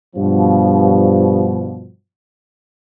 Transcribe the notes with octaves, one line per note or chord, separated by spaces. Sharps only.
G2 B2 F3